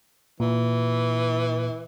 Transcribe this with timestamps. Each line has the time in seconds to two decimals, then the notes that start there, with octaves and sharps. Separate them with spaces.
0.40 A#2 E3